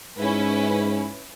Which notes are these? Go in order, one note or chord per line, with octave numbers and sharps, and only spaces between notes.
G#2 C#4 E4 B4